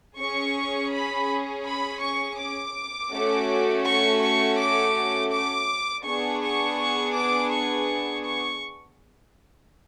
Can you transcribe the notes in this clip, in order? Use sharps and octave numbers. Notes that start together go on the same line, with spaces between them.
C#4 G#4 C#6
B5
B5
C#6
D6
A3 C#4 F#4
C#6
C#6
D6
D6
B3 D4 G#4 C#6
C#6
C#6
D6
C#6
C#6